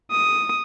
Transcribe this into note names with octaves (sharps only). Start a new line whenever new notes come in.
D#6